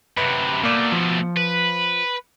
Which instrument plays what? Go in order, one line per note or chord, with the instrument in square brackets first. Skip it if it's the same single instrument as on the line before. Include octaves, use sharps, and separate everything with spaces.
[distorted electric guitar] F#2 C3 [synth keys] B4
[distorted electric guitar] B2 A3 [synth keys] A#3 D5
[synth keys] F3
[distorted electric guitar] B4